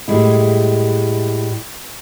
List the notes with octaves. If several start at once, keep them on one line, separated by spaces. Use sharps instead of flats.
A2 G3 G#3 E4